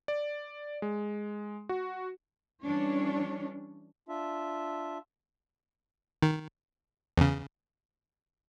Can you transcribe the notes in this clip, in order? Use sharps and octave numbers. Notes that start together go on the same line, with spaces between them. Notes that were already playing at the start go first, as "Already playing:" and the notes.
D5
G#3
F#4
E3 G3 C#4 D4 C#5
D4 F4 E5
D#3
E2 C#3